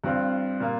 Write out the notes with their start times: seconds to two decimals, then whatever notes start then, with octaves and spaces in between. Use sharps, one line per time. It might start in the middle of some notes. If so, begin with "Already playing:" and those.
0.04 G2 G3 C4 F4
0.60 A#2 A#3 F4